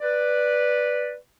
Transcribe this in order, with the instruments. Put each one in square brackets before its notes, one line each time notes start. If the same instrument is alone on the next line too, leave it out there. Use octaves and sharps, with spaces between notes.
[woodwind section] B4 D5